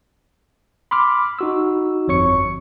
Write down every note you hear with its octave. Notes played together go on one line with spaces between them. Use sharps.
B5 C6 D6 F6
D#4 F#4 E6
G1 F2 C#5 C#6 C#7